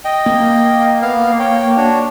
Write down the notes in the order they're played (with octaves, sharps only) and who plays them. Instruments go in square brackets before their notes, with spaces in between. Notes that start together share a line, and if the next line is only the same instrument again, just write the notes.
[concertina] D#5 G5
[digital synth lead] A#3
[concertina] B3 F5
C#5 G5
D4 F#4 C#5